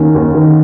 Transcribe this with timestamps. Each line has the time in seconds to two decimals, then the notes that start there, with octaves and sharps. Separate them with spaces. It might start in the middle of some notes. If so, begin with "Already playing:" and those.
Already playing: D#2 D#3 C#4
0.14 D#2
0.35 D#3